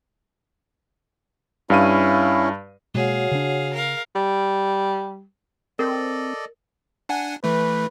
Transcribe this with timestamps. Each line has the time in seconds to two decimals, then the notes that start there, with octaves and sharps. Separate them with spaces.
1.70 G2 C#4 E4 F5 D#7
2.95 B2 G#3 A#3 F#4 G#4 C#5 F5 F#5
3.31 C#3 D4
3.73 A#4 F5
4.15 G3
5.79 C4 A4 A#4 D5 D#5
7.09 D4 F#5 G#5
7.44 E3 A3 B4